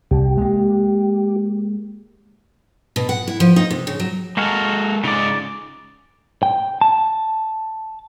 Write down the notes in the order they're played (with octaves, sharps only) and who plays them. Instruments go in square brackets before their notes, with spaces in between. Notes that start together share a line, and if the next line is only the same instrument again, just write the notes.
[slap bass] C2 [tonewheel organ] G4
[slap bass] G#3 A#3
[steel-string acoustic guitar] B2
F#5
E4
F3
D#4
C3
C#3
F#3
[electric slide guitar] G#3 A4 [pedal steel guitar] A#3 F#4 A#4
[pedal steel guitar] C#3 D5 [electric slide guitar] G#3 D#4 F4
[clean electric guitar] G5
A5